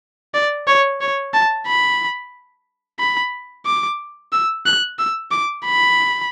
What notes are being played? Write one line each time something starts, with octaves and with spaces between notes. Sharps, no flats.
D5
C#5
C#5
A5
B5
B5
D6
E6
F#6
E6
D6
B5